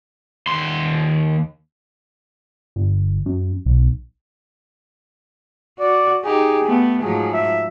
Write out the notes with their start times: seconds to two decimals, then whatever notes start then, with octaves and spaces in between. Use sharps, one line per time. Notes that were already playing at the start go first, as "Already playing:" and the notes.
0.47 D#2 C6
2.76 G1
3.26 F#2
3.65 B1
5.79 F#4 D5
6.24 D#4 G4 G#4
6.64 A3 B3
7.02 G#2 F3 F#3 G#4
7.33 E5